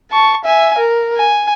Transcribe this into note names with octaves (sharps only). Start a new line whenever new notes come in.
A5 C#6
E5 G#5
A#4
G#5